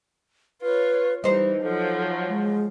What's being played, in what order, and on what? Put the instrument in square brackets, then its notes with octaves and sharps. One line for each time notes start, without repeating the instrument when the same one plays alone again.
[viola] F4 C#5 [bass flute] B4
[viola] E3 [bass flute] G3 [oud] D#4 C5
[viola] F3 F#3 [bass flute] A4
[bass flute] G#3